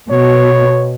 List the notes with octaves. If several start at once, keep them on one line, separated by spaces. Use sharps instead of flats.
B2 C#5